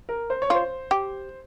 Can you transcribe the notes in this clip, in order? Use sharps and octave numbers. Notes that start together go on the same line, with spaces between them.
A#4
C5
C#5
F4 C5
G4